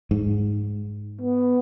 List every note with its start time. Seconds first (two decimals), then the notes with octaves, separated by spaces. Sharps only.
0.11 G#2
1.21 B3